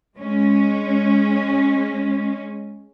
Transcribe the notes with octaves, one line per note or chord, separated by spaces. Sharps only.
G#3 C#4